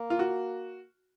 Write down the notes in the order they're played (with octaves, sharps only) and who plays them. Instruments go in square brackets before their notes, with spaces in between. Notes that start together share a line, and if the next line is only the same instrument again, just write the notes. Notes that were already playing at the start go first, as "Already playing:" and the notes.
Already playing: [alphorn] A#3
[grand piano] F4
F#4